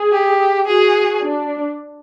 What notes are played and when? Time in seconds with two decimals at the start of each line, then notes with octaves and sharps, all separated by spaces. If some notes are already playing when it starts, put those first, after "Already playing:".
Already playing: G#4
0.12 G4
0.67 F#4 G#4
1.22 D4